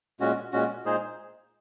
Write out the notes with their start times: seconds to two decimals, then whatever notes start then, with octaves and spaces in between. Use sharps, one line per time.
0.20 A#2 G#3 C#4 F#4
0.52 A#2 G#3 C#4 F#4
0.85 A#2 G#3 D#4 G#4 C5